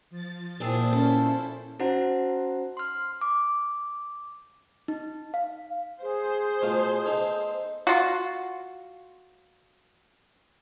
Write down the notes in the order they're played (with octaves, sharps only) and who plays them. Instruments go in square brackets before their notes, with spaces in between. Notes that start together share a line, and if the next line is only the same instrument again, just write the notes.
[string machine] F3 A6
[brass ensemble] A#2 [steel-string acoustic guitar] C4 D4 G#4 [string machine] E4 C5
[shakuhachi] C#4 [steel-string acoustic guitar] A4
[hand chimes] C#4 D#4 F#4 C5 F#5 A#5
C6 F6
D6
D#4
F5
[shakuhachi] G#4 [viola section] C5
[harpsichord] B2 A3 F4
B3 D#4 A4
[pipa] F4 F#4